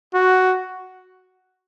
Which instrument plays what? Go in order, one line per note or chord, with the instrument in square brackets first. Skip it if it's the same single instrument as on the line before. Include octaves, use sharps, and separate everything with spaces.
[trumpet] F#4